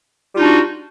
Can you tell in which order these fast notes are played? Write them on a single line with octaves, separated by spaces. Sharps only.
G3 F4 D#4 D4 F#4